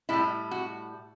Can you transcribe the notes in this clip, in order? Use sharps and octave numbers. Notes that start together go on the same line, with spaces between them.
A2 G3 E4
F#4